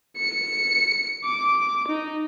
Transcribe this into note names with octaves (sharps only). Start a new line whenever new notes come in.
C#7
D6
D#4